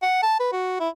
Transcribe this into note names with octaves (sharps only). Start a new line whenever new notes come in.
F#5
A5
B4
F#4
E4